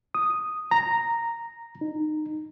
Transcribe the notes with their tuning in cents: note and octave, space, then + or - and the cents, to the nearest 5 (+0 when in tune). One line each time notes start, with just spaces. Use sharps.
D#6 +0
A#5 -5
D#4 -25